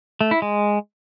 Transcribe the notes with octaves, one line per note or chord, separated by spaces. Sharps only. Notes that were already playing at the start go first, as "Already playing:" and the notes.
A3
E4
G#3